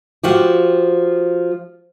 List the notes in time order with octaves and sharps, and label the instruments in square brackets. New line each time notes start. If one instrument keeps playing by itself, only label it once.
[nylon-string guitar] F3 F#4 G4